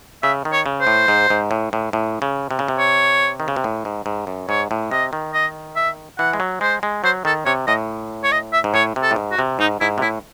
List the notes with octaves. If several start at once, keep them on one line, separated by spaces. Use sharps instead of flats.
C#3 E5
D#3
C#5
C#3
C5
A2
G#2
G#2
A2
A2
A2
C#3
C3
C#3
C3
C#5
D#3
C#3
C3
A2
G#2
G#2
F#2
G#2 C#5
A2
C3 D#5
D#3
D#5
E5
E3 F#5
G#3
F#3
G#3 C5
G#3
F#3 C5
D#3 A4
C3 C#5
A2 D#5
C#5
D#5
E5
G#2
A2 C#5
C3
A4
A2
G#2
F#4
C3
G#2 D#4
G#2 E4
C3
A2 E4